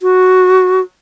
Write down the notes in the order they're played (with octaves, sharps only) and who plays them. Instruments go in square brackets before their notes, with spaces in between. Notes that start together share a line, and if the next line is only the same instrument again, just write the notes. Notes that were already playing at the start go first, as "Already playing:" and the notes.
[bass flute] F#4